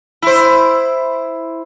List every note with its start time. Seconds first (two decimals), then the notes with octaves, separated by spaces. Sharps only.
0.22 E4 C5